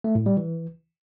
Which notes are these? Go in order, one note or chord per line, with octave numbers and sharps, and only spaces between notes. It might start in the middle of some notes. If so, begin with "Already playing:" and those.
A3
A2
G3
E3